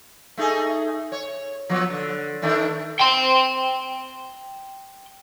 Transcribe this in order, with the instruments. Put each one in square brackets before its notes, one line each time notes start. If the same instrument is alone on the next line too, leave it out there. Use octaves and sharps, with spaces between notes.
[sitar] A3 D#4 G#4
C#5
F3 F#3 B3
D3
D#3 A3 D4
[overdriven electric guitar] G5 C6